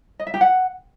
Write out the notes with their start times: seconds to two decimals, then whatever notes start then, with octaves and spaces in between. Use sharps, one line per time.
0.20 D#5
0.27 E5
0.34 G4
0.41 F#5